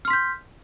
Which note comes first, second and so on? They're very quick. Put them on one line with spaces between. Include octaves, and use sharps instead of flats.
F6 C6 B6 G6